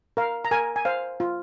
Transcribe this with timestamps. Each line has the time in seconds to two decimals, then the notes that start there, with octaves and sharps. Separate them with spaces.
0.17 A#4 F5
0.45 A#5
0.51 A#4 G#5
0.76 G#5
0.85 C5 F5
1.20 F4